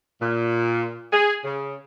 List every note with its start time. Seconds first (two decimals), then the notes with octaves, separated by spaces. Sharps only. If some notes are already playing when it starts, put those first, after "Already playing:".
0.21 A#2
1.13 G#4
1.44 C#3